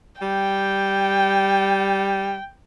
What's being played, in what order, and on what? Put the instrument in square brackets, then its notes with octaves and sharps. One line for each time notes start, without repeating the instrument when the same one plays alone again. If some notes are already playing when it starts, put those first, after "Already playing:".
[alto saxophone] G3 [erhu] G5